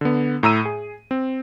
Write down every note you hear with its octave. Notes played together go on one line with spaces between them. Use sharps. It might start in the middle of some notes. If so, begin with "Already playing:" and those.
D3 B3
A2 A#5 E6 D#7
G#4
C4